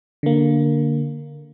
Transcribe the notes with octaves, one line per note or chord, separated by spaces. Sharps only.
D3 A#3